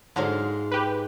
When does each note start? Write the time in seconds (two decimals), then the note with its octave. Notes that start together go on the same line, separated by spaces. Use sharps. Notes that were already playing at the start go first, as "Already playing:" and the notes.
0.16 G#2 D3 F#3 G#3 F4
0.72 G4 B4